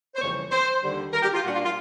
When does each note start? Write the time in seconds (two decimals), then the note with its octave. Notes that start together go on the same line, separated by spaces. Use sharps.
0.15 C5
0.20 F2 C#3 E3 G3 A#3 C#5
0.51 C5
0.82 D#2 D3 G3
1.13 A#4
1.23 G4
1.34 F4
1.44 A#2 G3 A#3 D4 F#4
1.55 F4
1.65 F4